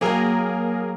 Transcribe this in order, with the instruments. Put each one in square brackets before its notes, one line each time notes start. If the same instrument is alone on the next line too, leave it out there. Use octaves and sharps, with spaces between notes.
[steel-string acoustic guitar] F#3 G5 [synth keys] A#3 G#4 A#4